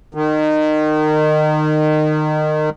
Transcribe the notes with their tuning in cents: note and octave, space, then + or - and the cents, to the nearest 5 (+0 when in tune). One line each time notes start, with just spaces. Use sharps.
D#3 -25